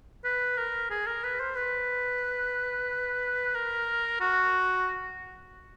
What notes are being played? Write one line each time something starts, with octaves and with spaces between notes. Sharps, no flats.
B4
A#4
G#4
A#4
B4
C5
B4
A#4
F#4